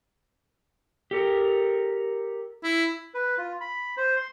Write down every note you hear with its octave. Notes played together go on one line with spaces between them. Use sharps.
G4 A4 A#4
E4
B4
F4
B5
C5
C6